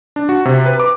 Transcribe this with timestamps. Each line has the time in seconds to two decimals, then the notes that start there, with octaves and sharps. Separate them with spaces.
0.16 D4
0.29 F#4
0.45 C3
0.66 B4
0.80 D6